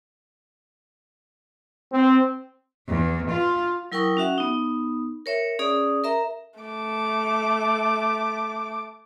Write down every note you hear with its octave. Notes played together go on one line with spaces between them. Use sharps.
C4
E2
F4
F#3 E4 A#4 G5 C#6 D#6
C#4 F#4 E5 F#5
B3 D#4
A#4 C#5 E5
C#4 G#4 D5 D#6
A#4 E5 A#5
A3 D6